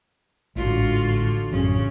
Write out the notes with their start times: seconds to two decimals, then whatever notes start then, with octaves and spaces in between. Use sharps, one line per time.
0.56 A1 G#2 D3 F4 F#4
1.51 A1 F#2 C#3 C#4